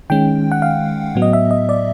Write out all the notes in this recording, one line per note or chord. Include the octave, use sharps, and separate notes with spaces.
D#3 G#3 C#4 G5
F#5
F5
A2 F#3 B3
D#5
E5
D#5
D5